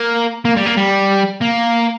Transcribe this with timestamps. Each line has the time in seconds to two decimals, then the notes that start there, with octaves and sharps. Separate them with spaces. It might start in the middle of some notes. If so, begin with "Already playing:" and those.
Already playing: A#3
0.45 A#3
0.57 G3
0.66 A#3
0.78 G3
1.42 A#3